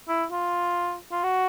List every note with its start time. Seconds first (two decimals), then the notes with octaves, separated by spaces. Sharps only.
0.08 E4
0.31 F4
1.12 F4
1.24 F#4